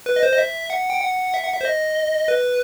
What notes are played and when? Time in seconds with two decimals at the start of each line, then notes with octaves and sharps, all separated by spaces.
0.06 B4
0.16 D#5
0.23 C5
0.33 D#5
0.38 E5
0.70 F#5
0.90 G5
1.02 F#5
1.34 E5
1.43 F#5
1.53 E5
1.61 C5
1.65 D#5
2.28 B4